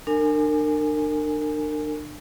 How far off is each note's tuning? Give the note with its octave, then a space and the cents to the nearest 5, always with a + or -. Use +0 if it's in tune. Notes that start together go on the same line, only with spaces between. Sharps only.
D4 +40 A#4 -30 G#5 +0